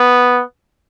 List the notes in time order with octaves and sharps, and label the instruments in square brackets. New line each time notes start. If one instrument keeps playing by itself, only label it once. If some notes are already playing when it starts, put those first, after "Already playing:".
Already playing: [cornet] B3